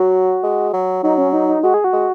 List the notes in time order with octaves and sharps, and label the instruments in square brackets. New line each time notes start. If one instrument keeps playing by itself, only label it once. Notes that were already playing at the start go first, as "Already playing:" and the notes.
Already playing: [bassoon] F#3 [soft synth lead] F#4
[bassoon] G#3
F#3
[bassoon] F#3 [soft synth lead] D#4
[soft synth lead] C#4
D#4
D#4
[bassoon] G#3 [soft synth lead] F#4
[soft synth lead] G#4
F#4
[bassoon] G#3